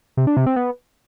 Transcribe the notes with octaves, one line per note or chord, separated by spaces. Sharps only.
C3
D4
C3
C4
B3